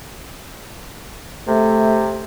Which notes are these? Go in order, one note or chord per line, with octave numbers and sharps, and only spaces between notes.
C3 A3